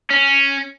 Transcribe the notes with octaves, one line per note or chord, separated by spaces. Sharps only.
C#4